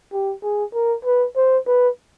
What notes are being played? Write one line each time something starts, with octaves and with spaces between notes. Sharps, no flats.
G4
G#4
A#4
B4
C5
B4